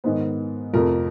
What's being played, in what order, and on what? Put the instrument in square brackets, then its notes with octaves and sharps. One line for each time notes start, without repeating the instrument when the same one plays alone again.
[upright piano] G#2 D#3 G#3 B3 C5
F2 C3 F3 A3 A#4